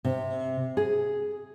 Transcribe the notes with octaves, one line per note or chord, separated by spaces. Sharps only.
C3
G#4